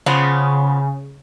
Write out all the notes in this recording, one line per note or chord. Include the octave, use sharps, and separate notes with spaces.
C#3 F3 B3